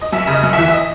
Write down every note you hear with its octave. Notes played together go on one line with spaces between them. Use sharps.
D#5
F#2 E5
C#3
D#5
F#2
E3 E5
E5
D#5